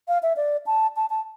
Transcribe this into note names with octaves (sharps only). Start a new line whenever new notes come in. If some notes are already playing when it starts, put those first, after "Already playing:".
F5
E5
D5
A5
A5
A5